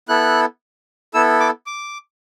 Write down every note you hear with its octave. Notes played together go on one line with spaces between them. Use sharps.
B3 E4 A4 F#6
B3 E4 A4 E6
D6
D6